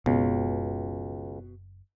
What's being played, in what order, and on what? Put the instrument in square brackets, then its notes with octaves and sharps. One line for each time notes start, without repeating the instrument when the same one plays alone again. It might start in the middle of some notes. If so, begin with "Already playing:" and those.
[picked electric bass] F#1 B3 C4 [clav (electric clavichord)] C#2 [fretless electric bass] B2